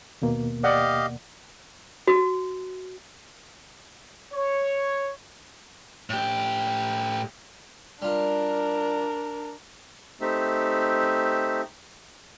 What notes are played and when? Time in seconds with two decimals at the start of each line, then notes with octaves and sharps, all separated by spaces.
0.22 D#2 B2 A#3
0.64 G4 D5 D#5 F5 F#5
2.08 F#4
4.34 C#5
6.10 A2 G4
8.02 G3 D4 F4 A#4
10.21 A3 C4 D#4 G4 E5